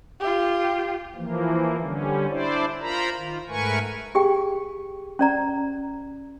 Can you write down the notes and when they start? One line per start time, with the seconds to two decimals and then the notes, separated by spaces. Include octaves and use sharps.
0.20 F4 G4
1.15 E3 F3 A#3
1.80 D3 G3 C#4
2.29 D4 E4 C5 D5
2.81 F4 A#4 C5 A#5 B5
3.17 D#3 F4
3.48 G#2 A3 A#4 B4 G#5 C#6
4.15 G4 G#4 G5
5.19 C#4 D5 A#5